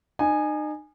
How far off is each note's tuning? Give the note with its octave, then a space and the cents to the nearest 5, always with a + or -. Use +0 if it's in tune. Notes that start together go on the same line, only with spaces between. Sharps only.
D#4 -35 G#5 +0